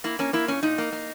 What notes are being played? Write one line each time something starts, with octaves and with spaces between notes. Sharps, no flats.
A#3 E4
A#3 C#4
A#3 E4
A#2 C#4
A#2 D#4
A#3
A#3